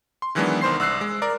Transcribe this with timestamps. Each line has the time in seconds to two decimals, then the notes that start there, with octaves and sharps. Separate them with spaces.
0.22 C6
0.35 D#3 E3 F#3 G#3 B3 D4
0.61 C2 D#3 C5 C6 C7
0.80 C2 E6 F#6 C7
1.01 G#3
1.22 A#4 D5